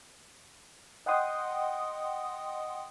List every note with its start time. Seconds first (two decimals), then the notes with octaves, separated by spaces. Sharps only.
1.06 D#5 F#5 G5 C6 D#6